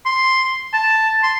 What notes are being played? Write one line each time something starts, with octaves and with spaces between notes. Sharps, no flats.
C6
A5
C6